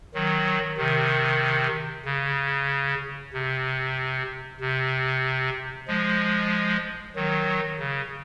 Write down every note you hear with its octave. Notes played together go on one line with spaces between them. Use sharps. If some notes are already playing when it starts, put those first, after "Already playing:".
D#3 F#3
C3 D#3
C#3
C3
C3
F3 G#3
D#3 F#3
C#3